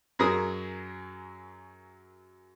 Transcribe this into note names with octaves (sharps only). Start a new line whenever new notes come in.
F#2 F#3 G#4 A#4 D#6